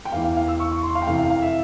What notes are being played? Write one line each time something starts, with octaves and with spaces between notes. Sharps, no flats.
G5
E2 E3 F5
F5
F5
E6
C#6
C#6
C6
F5
G5
F2 C3 E3 F5
F5
F5
E5